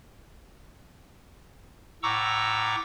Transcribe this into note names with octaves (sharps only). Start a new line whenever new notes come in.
A2 F#5 A#5 C#6 D6 E6